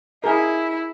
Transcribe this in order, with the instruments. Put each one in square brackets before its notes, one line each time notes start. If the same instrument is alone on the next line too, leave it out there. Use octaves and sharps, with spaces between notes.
[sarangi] E4 [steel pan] G#4 A#4